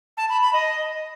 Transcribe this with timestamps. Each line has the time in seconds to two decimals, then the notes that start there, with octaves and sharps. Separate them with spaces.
0.17 A5
0.29 B5
0.41 B5
0.53 D#5